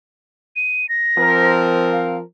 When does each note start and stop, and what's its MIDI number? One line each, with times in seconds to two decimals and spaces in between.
0.56 0.89 99
0.89 1.51 94
1.19 2.20 53
1.19 2.20 60
1.19 2.20 70
1.92 2.18 77